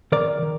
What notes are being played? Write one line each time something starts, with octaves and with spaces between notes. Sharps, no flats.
D#3 A#4 D5
D#3